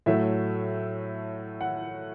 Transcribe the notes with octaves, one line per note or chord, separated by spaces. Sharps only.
A2 F#3 A3 E5
F#5